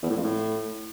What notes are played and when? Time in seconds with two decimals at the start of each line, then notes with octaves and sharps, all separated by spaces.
0.03 E2
0.10 A2
0.17 F2
0.24 A2